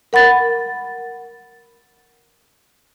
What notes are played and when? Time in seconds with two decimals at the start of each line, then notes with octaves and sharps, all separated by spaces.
0.13 A#4 F#5 B5 A6